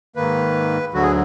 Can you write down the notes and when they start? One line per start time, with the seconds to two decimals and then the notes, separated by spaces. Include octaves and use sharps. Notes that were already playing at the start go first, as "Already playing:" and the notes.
0.16 G#2 D#3 A#3 B4
0.93 D2 D3 F#3 F#4
1.03 G#4